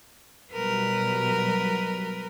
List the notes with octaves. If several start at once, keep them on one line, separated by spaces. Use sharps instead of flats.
B2 F#3 G3 A#4 B4